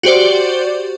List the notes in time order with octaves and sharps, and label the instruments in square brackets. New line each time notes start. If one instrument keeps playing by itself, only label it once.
[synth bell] F#4 G4 C5 D5